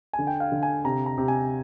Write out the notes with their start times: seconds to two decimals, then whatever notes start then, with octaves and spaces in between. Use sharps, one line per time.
0.13 G#5
0.19 D3
0.27 G5
0.40 F5
0.52 D3
0.63 G#5
0.84 C3 A#5
1.06 A#5
1.18 C3
1.28 G#5